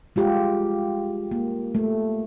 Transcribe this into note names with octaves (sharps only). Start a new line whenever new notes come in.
G#3 F4 G4
A#3
A3